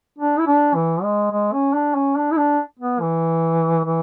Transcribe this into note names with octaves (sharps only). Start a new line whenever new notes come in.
D4
E4
D4
E3
G#3
G#3
C#4
D4
C#4
D4
E4
D4
B3
E3
E3